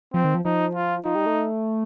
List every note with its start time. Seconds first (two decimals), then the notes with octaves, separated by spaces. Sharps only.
0.14 F3 C4
0.24 D#3
0.35 F3
0.45 F3 D#4
0.75 F4
1.05 F3 D#4
1.15 G3
1.26 A3